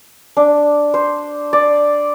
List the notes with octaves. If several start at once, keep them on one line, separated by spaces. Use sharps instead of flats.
D4
C5
D5